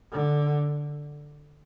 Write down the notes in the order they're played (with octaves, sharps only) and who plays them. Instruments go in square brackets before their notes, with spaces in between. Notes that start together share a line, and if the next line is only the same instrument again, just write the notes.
[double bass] D3